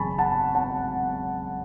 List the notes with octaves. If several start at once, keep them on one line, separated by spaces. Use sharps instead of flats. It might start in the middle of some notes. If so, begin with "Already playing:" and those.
Already playing: G#1 F#2 C#3 G#5 A5 B5 C#6
F#5 A5
F#5 A5